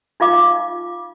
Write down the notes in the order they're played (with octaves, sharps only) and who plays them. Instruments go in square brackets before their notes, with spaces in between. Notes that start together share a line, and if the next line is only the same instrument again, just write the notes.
[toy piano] D#4 F4 F5 D6